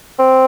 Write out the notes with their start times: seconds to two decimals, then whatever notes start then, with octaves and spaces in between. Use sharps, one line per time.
0.19 C4